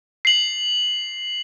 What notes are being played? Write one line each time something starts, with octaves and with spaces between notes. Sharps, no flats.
C7 F#7